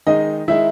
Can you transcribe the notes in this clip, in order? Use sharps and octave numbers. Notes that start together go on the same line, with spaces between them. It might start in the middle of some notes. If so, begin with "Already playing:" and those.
D#3 G#3 D#4 D#5
D#3 G#3 D#4 E4 E5